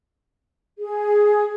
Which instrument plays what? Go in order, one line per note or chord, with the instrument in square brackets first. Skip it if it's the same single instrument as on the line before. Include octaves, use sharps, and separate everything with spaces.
[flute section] G#4